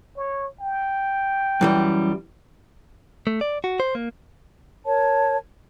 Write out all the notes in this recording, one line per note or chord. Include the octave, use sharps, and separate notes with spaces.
C#5
G5
F#2 E3 G3
A3
D5
F#4
C5
A#3
A#4 C#5 A5